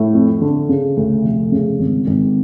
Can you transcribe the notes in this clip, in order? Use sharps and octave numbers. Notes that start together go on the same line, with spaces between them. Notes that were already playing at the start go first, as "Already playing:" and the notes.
Already playing: A2
F2
D3
C#3
D2
F1
C#3
G#1
G#1